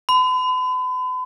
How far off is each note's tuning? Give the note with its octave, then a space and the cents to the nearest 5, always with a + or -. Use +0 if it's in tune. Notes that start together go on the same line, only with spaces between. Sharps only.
B5 +40